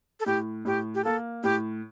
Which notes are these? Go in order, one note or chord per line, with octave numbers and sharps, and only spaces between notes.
A4
A2 G4
A2 G4
G4
A#3 A4
A2 G4